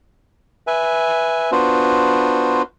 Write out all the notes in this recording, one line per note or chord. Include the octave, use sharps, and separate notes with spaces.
B4 E5 G#5
B3 D4 F4 F#4 B4 C5